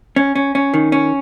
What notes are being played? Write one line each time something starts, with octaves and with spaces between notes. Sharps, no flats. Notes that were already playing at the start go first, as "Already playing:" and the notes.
C#4
C#4
C#4
D#3
C#4